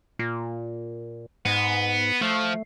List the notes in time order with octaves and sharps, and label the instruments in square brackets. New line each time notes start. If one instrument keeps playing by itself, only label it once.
[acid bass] A#2
[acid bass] G#2 [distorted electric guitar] B3
[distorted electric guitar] F3 [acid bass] A3